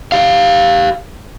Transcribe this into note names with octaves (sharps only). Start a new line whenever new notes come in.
G4 F5